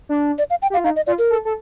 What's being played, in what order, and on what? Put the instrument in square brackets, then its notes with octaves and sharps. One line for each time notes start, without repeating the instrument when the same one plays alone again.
[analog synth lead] D4
[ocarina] D5
F5
G5
[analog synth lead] G4
[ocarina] F5
[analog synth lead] F4
[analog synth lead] D#4 [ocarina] F5
[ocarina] D#5
[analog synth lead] F4 [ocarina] D5
[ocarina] A#4
[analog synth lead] A4
A4